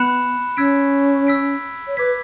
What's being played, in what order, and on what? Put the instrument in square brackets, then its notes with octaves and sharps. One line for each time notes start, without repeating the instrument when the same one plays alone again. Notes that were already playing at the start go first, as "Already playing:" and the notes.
Already playing: [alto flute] B3 [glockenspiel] B5 F#6 C#7 E7
[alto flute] C#4 [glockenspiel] E6 G#6 B6 D7
[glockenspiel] E6 G#6 B6 D7
[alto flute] C#5
[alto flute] B4 [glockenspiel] D6 G#6 B6